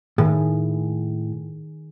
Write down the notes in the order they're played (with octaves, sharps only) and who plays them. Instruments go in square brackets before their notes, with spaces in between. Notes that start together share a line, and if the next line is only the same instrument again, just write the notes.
[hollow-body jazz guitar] A2 [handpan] D#3 G#4